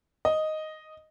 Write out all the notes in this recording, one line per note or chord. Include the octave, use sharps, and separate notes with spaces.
D#5